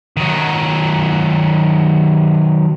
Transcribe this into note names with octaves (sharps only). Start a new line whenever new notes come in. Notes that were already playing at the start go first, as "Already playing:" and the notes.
D#3 F#3